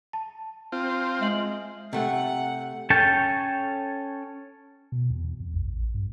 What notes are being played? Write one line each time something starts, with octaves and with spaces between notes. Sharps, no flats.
A5
C4 F4
G#3 E5 C7 F#7
C3 A3 F#5
C#4 A4 C#5 G5 A5
B2
E2
F2
A#1
A1
G2